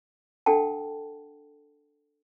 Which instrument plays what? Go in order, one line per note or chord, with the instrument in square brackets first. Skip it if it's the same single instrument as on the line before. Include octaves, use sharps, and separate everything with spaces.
[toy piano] D4 A4 F#5 G5 A5